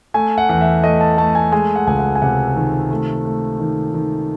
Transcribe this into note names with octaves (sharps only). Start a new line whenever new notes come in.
A3 G#5
F#5
E2 F#5
E5
A3 D#5
A5
A3 A5
G#5
G#3 G#5
F#5
C#2 G#5
F#5
G#5
C3 F#5
D#3
A3
A3
D#3
D#3